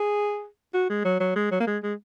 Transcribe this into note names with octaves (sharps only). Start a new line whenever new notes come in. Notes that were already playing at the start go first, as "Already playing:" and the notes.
Already playing: G#4
F#4
G#3
F#3
F#3
G#3
F#3
A#3
G#3
G#3